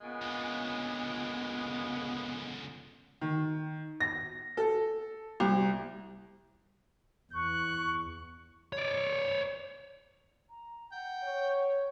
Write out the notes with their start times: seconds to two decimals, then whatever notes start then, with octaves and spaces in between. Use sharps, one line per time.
0.01 A#2 C#3 G#3 B3
0.22 C#2 D3
3.21 D#3
4.00 A#6
4.57 A4
5.40 C2
7.33 E2 C#6 F#6
8.73 C#5 D5
10.50 A#5
10.92 F#5 G5
11.23 C#5